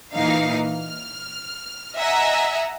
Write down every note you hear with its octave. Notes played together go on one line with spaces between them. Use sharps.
A#2 E3 D#4 F5
F6
D#5 E5 F#5 G#5 A#5